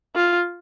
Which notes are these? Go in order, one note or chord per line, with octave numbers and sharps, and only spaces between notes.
F4